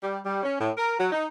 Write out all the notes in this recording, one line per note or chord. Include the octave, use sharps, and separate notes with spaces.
G3
G3
C#4
A2
A#4
F#3
D#4